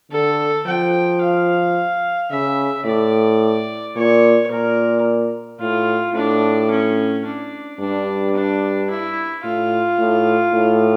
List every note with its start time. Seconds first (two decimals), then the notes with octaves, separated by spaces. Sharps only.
0.11 D3 A4
0.67 F3 G5
1.21 F5
2.30 C#3 E5
2.85 A2 D5
3.96 A#2 C#5
4.50 A#2 A#4
5.60 A2 F4
6.14 A2 D4
6.70 C#4
7.25 D4
7.79 G2 D4
8.35 D4
8.90 E4
9.44 A2 F4
9.99 A2
10.53 A2